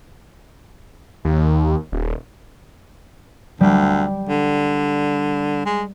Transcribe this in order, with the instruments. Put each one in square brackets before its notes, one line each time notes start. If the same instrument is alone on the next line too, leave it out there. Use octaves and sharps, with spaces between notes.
[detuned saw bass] D#2
D#1
[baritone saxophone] D2 [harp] G3
[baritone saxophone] D3
G#3